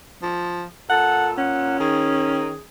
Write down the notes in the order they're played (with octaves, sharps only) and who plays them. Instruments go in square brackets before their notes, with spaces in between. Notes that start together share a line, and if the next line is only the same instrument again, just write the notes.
[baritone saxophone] F3
[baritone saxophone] A#2 [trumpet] A4 [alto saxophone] F#5
[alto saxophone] C#4 [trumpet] F#5
[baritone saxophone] D#3 [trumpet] G#4